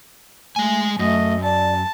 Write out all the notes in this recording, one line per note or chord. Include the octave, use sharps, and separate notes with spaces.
G#3 A3 G#5
F#2 A3 D#5
D5 A5